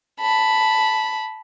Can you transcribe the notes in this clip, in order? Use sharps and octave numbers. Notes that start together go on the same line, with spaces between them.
A5 B5